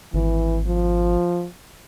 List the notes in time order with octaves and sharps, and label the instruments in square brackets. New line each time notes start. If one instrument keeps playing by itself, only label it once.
[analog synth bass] G#1 [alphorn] E3
[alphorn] F3